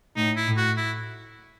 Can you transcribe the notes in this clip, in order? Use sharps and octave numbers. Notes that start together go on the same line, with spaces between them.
A2 D#4
E4
A2
F#4
E4